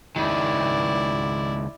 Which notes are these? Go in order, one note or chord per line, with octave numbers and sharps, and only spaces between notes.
C#2 D#3 E4 D5